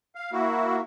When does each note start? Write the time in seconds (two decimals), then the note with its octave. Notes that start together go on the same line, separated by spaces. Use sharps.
0.15 F5
0.32 A#3 E4 F#4